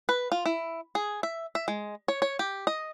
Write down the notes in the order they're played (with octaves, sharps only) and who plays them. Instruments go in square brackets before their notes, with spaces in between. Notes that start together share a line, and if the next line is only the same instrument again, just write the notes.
[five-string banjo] B4
F4
E4
G#4
E5
E5
G#3
C#5
C#5
G4
D#5